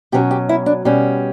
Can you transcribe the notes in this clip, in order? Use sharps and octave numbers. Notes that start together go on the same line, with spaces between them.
B2 F#3 C#4 G4
G4
E4
D4
B2 G3 C#4